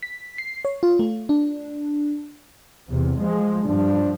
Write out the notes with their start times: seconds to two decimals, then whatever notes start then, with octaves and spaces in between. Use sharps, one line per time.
0.03 B6
0.38 C7
0.65 C#5
0.83 F4
0.99 A3
1.29 D4
2.88 E2 C3
3.21 F3 G#3
3.65 G2 F3 D4